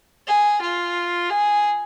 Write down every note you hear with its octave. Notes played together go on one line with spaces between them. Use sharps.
G#4
F4
G#4